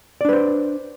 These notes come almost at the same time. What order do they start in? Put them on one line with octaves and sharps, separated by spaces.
D5 D4 B4 C5